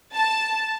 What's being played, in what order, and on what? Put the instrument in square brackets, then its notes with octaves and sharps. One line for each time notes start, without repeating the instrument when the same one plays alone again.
[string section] A5